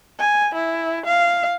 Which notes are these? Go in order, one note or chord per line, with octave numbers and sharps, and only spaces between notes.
G#5
E4
F5